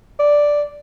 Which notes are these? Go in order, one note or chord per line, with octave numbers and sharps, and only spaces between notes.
D5